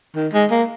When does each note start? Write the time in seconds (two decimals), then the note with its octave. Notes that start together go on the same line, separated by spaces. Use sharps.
0.15 D#3
0.33 G#3
0.51 A#3